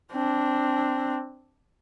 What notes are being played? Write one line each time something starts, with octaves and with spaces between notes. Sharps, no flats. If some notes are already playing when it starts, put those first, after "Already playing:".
C4 D4